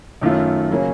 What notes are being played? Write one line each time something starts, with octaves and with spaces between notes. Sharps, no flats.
F#2 D#3 A3 C#4 F4
C#3 F#3 A#3 C#4